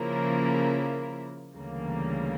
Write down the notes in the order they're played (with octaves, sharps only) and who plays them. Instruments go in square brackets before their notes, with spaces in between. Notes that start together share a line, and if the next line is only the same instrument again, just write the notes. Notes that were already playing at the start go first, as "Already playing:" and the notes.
Already playing: [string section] C#3 F3 A#3 E4 A#4
D2 C#3 E3 G3 A#3